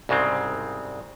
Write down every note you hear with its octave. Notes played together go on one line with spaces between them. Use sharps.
C2 G#2 C#3 G#3 C4